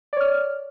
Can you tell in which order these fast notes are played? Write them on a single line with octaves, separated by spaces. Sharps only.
D5 C#5 F6